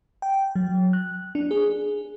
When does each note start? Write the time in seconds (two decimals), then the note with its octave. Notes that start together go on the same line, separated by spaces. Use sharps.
0.22 G5
0.56 F#3
0.93 F#6
1.35 D4
1.51 G#4